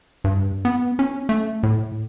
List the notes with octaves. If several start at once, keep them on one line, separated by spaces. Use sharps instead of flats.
G2
B3
C#4
A3
A2